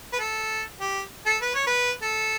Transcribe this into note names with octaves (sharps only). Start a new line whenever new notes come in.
B4
A4
G4
A4
B4
C#5
B4
A4